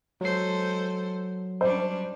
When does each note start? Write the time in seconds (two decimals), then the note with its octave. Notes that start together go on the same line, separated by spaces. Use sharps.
0.21 F#3 G#3 A4 C5 C7
1.61 G3 C#4 D4 C5